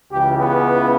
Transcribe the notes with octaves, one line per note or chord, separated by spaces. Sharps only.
C#2 C#3 E3 G4
B3